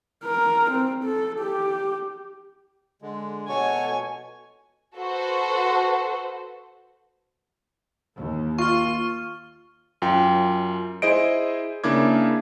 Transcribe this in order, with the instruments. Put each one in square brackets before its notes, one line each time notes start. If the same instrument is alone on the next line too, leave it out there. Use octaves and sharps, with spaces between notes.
[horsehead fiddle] A#4
C4
A4
G4
[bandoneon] D3 G#3
[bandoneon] B2 C#6 [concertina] F#4 A4 C#5 [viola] G#5
[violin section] F#4 A4 B4 C5
[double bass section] D#2
[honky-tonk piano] F4 [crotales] C#6 F6
[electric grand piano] F#2 F4 G5
E4 G#4 C5 D#5 D7
C#3 A#3 D4 E4 D6 G#6